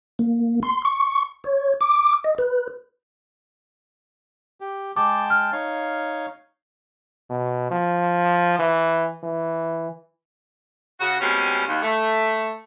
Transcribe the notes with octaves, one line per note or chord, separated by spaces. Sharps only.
A#3
C6
C#6
C#5
D6
D#5
B4
G4
G#3 G5 A5 D6
F6
D#4 C#5 F5
B2
F3
E3
E3
C#3 F#4
B2 G3 G#3 C4 C#4
D#2
A3